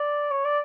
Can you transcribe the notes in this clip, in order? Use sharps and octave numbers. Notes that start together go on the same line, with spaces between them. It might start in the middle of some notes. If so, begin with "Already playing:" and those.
Already playing: D5
C#5
D5